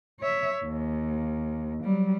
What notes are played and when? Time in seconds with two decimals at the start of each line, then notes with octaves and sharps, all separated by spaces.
0.20 C#5 E5
0.65 D#2
1.84 F#3 G3